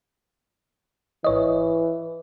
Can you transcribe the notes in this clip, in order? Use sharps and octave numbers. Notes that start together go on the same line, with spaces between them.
G#1 E3 C#5 D#5